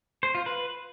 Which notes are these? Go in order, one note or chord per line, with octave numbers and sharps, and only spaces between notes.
C5
F4
B4